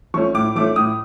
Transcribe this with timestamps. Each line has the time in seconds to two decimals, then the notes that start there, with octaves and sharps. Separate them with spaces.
0.14 F3 A3 C#4 C#6
0.34 A2 D6
0.55 F3 A3 C#4 D6
0.76 A2 D#6